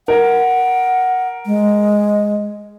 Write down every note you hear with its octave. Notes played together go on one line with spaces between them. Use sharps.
A#4 F#5
G#3